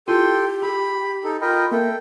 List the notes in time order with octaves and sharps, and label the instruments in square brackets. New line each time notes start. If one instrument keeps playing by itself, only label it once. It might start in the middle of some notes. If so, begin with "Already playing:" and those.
[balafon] E4 F4 [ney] G4 [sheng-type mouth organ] A4 G5 C6
[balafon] G#4 [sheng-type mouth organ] B5
[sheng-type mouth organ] D#4 A4
[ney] F4 [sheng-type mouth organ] A#4 D#5 G5 [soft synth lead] B5
[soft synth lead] A#3 [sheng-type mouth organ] A4 G5 [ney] E5